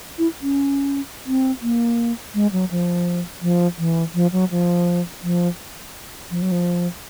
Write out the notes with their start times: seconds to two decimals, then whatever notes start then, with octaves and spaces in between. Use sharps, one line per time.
0.18 E4
0.42 C#4
1.26 C4
1.62 A#3
2.35 G#3
2.52 F#3
2.71 F3
3.42 F3
3.78 E3
4.14 F3
4.32 F#3
4.51 F3
5.23 F3
6.31 F3
6.42 F#3
6.52 F3